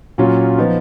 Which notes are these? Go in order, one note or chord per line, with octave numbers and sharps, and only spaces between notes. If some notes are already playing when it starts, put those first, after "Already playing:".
A#2 F#3 C#4 F4
F3 B3 D#4